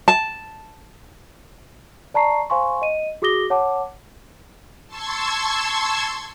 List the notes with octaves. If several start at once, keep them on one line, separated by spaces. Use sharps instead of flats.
A5
D5 A5 A#5 C#6 C7
C5 F5 G#5 C6 C#6
D#5 D#7
F#4 G#4 D6 D#6 A#6 G7
C#5 F#5 A5 D6
A5 C6 C#6 E6 G#6